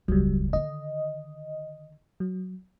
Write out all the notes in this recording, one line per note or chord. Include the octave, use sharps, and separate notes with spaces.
E1 C#2 F#3 G3
D3 D#3 D#5
F#3